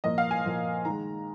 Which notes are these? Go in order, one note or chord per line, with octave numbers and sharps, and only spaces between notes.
A#2 F3 A#3 D#5
F5
G#5
A#2 F3 A#3
D#3 G#3 A#5